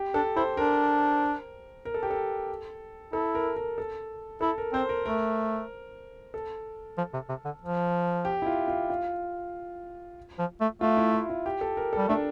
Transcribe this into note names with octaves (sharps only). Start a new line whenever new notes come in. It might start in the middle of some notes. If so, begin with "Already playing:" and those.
Already playing: G4
D4 A4
E4 C5
D4 A#4
A#4
A4
G4
A4
E4 A4
A#4
A#4
A4
E4 A4
A#4
C4 C5
A#4
A3 A#4
A4
F3
C3
C3
D3
F3
G4
E4
F4
F4
F4
F3
A3
A3 F4
E4
F4
F4
G4
A4
A#4
G3 A4
A3 D4